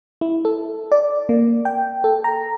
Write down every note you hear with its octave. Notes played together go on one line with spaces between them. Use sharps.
E4
A4
D5
A#3
G5
A4
A#5